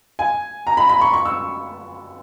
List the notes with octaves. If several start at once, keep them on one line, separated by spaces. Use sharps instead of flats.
G#5
A#5
B5
B5
C#6
C#6
E6